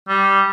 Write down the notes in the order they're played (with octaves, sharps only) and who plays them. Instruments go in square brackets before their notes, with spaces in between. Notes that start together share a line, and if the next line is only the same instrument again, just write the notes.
[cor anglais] G3